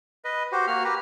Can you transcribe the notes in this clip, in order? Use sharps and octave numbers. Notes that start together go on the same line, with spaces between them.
B4 D#5
F#4 G4 C5
A#3 F#4 F6
G4 B4 A#5